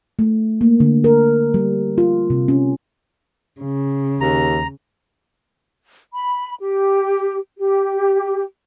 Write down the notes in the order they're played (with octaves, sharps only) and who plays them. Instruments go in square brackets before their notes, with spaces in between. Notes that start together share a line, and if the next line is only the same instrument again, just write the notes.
[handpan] A3
A#3
D3
A#4
G3
F4
C3
C#4
[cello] C#3
[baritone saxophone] D#2 [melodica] A#5
[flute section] B5
G4
G4